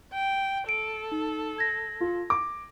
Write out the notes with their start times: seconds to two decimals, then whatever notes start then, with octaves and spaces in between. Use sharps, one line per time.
0.14 G5
0.69 A4 D7
1.12 D#4
1.58 G#6 A#6
2.01 F4
2.30 D6